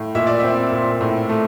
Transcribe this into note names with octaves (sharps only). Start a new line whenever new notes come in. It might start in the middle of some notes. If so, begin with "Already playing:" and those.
Already playing: A2
A#2 E5
D5
C4 E5
A#2
A2
A3